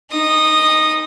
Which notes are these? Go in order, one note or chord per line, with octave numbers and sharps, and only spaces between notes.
D#4 D#6